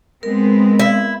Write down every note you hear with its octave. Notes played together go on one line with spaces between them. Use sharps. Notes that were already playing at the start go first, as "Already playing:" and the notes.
G#3 B3 C4 A#4
E4